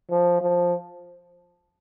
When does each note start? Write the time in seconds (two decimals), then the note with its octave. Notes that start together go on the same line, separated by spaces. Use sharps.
0.10 F3
0.41 F3